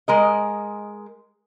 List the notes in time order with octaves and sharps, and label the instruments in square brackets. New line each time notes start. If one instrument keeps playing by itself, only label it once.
[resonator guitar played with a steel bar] G#3 A#4 D#5